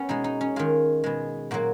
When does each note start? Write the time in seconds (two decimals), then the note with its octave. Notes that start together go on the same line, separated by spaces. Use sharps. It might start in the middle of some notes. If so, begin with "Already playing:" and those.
Already playing: B3 C#4
0.09 B2 G#3 D#4
0.24 D#4
0.41 C#4
0.56 D#3 G#3 F4
1.04 B2 G#3
1.51 A#2 F#3 A#3 F#4